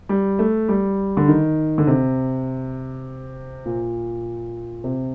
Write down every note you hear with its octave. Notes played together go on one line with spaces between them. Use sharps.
G3
A3
G3
D3
D#3
D3
C3
A#2
C3